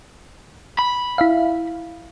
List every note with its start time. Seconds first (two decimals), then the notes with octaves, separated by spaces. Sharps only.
0.79 B5
1.18 E4 E5 F5